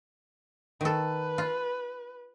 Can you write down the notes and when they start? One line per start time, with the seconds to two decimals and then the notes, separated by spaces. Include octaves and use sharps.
0.81 D#3 A4 B4
1.38 F4